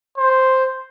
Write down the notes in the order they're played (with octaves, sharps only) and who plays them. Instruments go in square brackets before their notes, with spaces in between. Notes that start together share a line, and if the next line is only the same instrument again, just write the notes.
[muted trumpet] C5